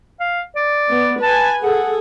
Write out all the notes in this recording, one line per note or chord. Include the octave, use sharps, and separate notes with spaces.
F5
D5
B3
B4 G#5 A5
G#4 A4 F#5